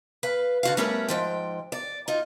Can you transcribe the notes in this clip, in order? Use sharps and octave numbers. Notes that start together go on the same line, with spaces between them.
B4 F5
D3 F#4 F5
G3 A3 C#4 G4 A#4 B4
G#2 F3 G5
D5
D#4 F4